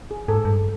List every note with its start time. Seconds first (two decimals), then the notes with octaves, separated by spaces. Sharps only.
0.11 G#4
0.28 G#2 A4
0.45 G2